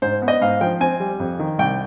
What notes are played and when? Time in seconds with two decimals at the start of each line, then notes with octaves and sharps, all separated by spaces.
0.02 G#2 C5
0.22 B3
0.28 D#5
0.41 G#2 F5
0.61 F3 G5
0.80 C4 G#5
1.00 G3
1.20 F2
1.39 D#3
1.59 C2 G5